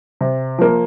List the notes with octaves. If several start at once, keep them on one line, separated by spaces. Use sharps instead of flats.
C3
F3 A#3